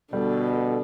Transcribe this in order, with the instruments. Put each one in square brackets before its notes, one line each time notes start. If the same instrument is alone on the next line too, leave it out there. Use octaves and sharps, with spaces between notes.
[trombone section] B2 [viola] D3 A4 [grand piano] G3